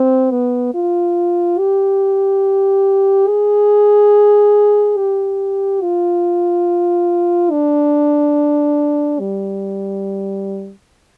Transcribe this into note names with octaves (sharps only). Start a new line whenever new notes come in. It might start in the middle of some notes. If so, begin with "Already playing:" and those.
Already playing: C4
B3
F4
G4
G#4
G4
F4
D4
G3